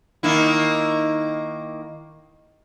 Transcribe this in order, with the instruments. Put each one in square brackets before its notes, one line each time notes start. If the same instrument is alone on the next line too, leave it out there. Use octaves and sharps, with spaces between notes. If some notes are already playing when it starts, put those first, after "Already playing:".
[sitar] D#3 A#3 E4